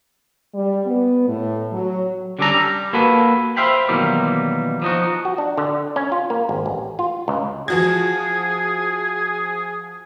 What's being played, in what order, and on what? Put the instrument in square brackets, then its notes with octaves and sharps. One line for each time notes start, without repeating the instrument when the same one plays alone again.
[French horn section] G3
B3
A2
F#3
[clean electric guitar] D3 G3 C#4 D4 A4 A#5
G3
A#3 F#4 A4 B4
C5 E5 F5 G5 B5
B2 D#3 E3 F#3 G3 A#3
F3 D#4 F#4
[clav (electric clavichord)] F#4
D4
D3
C#4
F4
A#3
G#1
A1
F4
C#2
[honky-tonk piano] F3 F#4 G#6 [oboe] G#4